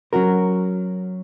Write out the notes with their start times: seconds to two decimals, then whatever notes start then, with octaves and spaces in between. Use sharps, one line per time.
0.13 F#3 C#4 F#4 A#4